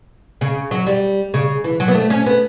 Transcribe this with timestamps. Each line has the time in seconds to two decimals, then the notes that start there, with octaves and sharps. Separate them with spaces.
0.41 C#3
0.71 F#3
0.87 G3
1.34 C#3
1.64 E3
1.80 F#3
1.88 B3
1.95 A3
2.10 C#4
2.26 B3